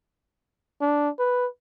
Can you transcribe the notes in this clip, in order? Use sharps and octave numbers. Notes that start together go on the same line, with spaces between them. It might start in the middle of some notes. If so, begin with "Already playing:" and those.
D4
B4